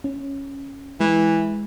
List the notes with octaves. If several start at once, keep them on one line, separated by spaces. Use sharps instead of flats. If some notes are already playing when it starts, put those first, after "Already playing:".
C#4
E3 G#3